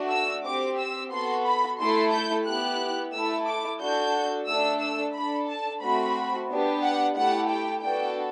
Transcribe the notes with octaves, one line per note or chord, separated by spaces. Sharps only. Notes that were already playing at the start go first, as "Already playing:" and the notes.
Already playing: A3 D4 F#4
E6
C4 G4 D6
E6
B3 F#4 A4 C6
B5
A3 E4 A4 C6
G6
B3 E4 G4 F#6
A3 E4 A4 E6
D6
D4 F#4 A4 G6
A3 D4 A4 E6
E6
D4 A4 B5
A5
A3 C4 F#4 B5
B3 D4 G4
F#5
A3 E4 G4 F#5
G5
B3 D4 F#4 A4 G5